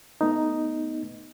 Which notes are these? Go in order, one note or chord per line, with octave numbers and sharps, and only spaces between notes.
A3 B3 D#4